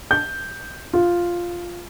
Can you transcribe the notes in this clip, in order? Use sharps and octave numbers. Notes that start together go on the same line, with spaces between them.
G6
F4